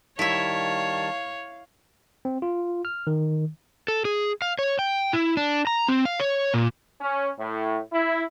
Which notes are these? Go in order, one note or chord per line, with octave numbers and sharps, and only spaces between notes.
D#3 G3 E4 C#5 E5 F5 A5
C4
F4
F6
D#3
A4
G#4
F5
C#5
G5
E4
D4
A#5
C4
F5
C#5
A#2
C#4
A2
E4